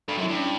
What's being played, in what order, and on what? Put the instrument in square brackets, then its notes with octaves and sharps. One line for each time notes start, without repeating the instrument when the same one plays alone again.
[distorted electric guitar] G2 [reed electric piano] A4
[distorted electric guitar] F#2
[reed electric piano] E4
[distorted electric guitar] G2
[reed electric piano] C#4